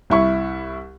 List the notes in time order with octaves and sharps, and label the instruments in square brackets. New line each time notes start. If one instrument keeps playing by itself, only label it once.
[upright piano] C2 E4 C#6